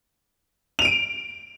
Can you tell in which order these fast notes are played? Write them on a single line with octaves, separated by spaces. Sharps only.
F7 D#7 D7